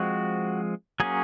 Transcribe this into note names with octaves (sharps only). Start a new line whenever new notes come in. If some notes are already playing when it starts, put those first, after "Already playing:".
Already playing: F3 G#3 C4 F#4
F#3 A#3 C#4 G#4